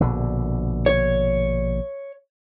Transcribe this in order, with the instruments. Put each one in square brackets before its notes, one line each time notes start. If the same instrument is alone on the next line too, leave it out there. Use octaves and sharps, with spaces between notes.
[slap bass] A#1 B2 D3
[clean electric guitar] C#5